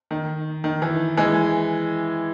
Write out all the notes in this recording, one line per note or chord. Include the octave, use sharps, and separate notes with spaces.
D#3
D#3
E3
E3 G#3